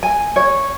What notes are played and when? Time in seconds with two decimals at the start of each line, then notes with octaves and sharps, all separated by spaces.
0.03 G#5
0.36 C#5